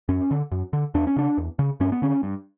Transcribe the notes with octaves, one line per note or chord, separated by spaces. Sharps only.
F#2 C#4
D3
F#2
D3
E2 D4
C#4
C#3 D4
E2
C#3
G2 C#4
B3
D3 C#4
G2